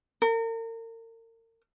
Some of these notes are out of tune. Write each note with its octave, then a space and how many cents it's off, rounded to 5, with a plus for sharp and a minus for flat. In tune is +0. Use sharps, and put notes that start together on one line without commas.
A#4 -40